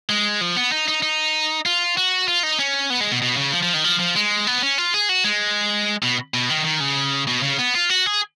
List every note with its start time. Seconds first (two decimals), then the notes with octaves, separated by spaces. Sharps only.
0.10 G#3
0.41 F3
0.57 B3
0.72 D#4
0.88 D#4
1.02 D#4
1.66 F4
1.97 F#4
2.28 F4
2.43 D#4
2.59 C#4
2.90 B3
3.01 G#3
3.12 B2
3.22 B2
3.37 C#3
3.53 F3
3.63 F3
3.74 D#3
3.84 F3
3.99 F3
4.15 G#3
4.47 B3
4.62 C#4
4.78 F4
4.94 G#4
5.09 F#4
5.24 G#3
6.03 B2
6.34 B2
6.50 D#3
6.65 D#3
6.80 C#3
7.27 B2
7.43 C#3
7.59 B3
7.75 F4
7.89 F#4
8.06 G#4